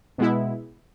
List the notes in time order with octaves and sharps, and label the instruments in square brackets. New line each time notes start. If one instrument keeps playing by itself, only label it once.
[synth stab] B2 G#3 B3 E4